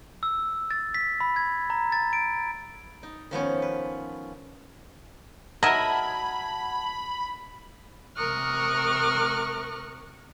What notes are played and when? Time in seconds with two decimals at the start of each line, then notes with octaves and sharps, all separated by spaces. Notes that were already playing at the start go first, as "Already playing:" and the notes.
0.23 E6
0.71 A6
0.94 B6
1.20 B5
1.36 G#6
1.70 A#5
1.92 A6
2.13 D7
3.03 D#4
3.31 D#3 F3 B3 C#4
3.62 B4
5.63 F#3 A#4 D#5 E5 F#5 A5 B5 G#6
8.15 C3 A#4 C#6 D#6 F6 F#6